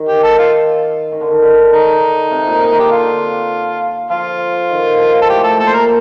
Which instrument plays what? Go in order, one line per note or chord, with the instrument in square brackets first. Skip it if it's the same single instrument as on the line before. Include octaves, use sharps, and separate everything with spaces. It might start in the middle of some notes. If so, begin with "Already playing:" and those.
Already playing: [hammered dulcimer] D#3
[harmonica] G4
A4
F4
[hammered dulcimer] D#3
D3
D#3
D3
[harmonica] D#4
[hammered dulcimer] C3
A#2
C3
[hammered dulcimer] D3 [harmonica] G4
[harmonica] F4
[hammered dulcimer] F3 [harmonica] F4
[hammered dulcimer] D#3
F3
[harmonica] A4
[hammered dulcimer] A2 A3 [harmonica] G4
[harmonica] A4
[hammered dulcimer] A#2 A#3 [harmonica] A4
[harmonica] C5
A#4